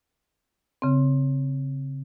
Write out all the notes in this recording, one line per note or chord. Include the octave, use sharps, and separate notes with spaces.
C#3 C4